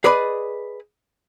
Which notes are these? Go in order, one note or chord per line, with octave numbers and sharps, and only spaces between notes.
G#4 B4 D5 D#5 B5